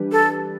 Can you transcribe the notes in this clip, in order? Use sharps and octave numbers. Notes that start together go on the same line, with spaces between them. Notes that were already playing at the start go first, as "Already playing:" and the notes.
Already playing: E3 G3 D4 G4 B4
A4